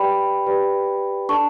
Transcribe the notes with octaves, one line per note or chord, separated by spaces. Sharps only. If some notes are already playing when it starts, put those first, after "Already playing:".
Already playing: G4 B4 D5 G5 B5
G4 B4 D5
D4 A4 D5 A5 C#6